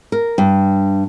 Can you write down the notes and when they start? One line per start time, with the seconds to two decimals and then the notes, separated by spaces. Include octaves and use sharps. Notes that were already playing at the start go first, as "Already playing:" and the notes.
0.12 A#4
0.38 G2